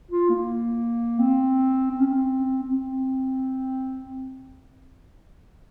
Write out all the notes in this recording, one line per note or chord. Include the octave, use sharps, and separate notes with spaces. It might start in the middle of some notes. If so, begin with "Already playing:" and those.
F4
A#3
C4
C4
C#4
C4
C4